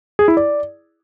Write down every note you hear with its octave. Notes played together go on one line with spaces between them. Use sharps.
G#4
E4
D5